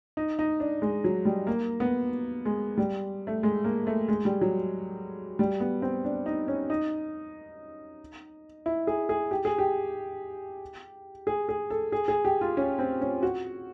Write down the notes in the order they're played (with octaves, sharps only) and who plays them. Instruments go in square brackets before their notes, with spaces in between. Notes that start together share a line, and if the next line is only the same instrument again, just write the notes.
[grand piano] D#4
D#4
D4
G#3
F#3
G3
A#3
B3
G#3
G3
A3
G#3
A#3
A3
G#3
G3
F#3
G3
B3
C4
D4
D#4
C#4
D#4
E4
G#4
G#4
G4
G#4
G4
G#4
G#4
A4
G#4
G#4
G4
F4
C#4
C4
C#4
F#4